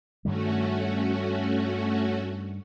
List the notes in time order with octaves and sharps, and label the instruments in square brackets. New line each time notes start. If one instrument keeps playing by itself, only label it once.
[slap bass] G2 D#3 G3 [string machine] A3 C#4 F#4